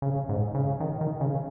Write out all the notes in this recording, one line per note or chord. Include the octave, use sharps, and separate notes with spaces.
C#3
G#2
C#3
D#3
D#3
C#3